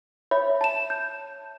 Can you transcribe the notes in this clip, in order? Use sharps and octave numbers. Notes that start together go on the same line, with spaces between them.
C#5 E5 B5
A5 E7
G6